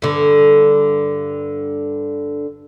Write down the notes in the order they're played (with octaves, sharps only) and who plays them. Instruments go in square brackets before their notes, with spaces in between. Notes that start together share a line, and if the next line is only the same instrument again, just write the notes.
[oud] G2 D3